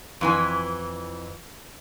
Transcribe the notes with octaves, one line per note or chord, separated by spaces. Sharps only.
F2 E3 G#5